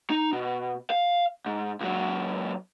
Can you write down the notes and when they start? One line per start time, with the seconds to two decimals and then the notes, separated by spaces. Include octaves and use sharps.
0.10 D#4
0.33 B2
0.90 F5
1.46 G#2
1.80 C#2 F#3